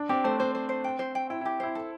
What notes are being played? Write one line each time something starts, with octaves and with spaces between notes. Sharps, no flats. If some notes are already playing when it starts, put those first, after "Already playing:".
Already playing: D4
C4 G4
A3 C5
C4 C5
C5
C5
G5
C5
G5
E4 G5
E4 G4
E4 C5
A4